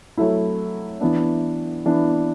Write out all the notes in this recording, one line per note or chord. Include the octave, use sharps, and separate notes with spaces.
F#3 A3 E4
E3 B3 D4
E3 B3 D4